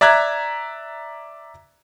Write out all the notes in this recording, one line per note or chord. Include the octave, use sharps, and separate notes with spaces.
D5 E5 A#5 F#6 G#6